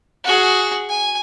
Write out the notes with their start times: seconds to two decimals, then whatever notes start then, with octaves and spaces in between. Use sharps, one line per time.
0.24 F#4 G#4
0.89 G#5